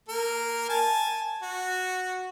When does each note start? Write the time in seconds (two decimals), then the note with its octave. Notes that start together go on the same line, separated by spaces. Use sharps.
0.09 A#3 A#4
0.69 G#5 A5
1.42 F#4